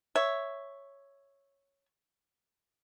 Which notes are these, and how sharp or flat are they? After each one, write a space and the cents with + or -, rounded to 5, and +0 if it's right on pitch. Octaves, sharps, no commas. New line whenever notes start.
C#5 +0 E5 +0